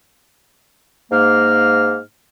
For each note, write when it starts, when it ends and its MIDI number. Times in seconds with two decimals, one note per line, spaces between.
1.11 1.99 44
1.11 1.99 58
1.11 1.99 89